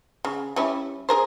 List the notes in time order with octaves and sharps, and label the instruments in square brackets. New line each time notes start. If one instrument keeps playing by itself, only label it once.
[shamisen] C#3
G3 C#4 E4
G#4 A#4 C5